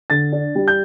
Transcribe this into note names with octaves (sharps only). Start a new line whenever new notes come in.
D3 A6
D4
G3
G6